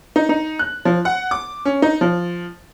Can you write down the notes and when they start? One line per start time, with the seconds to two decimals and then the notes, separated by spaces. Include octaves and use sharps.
0.16 D#4
0.29 D#4
0.59 F#6
0.85 F3
1.05 F#5
1.31 D6
1.65 C#4
1.82 D#4
2.01 F3